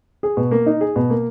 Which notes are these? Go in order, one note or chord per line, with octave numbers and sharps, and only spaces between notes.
G#4
B2
A#3
D#4
G#4
B2
A#3